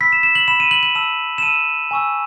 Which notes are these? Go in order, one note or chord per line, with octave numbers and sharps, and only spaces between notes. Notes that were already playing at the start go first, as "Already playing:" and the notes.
B5 E6 B6
E7
E7
F#7
B5 E6 E7
D#7
F#7
F#7
A5 E6 E7
E7
A5 E6 D#7
G#5 C#6 E6